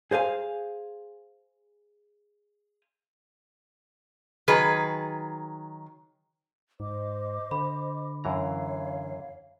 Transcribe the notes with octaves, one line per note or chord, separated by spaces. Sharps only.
G#4 C5 F5 G#5
D#3 F#3 G#4 B4
G#2 C5 D#5 D6
D3 B5
F#2 E3 C#5 F5 A#5